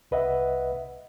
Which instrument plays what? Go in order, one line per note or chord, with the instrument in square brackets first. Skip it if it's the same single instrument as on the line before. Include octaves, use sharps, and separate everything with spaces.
[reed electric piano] C2 B4 D#5 E5 F#5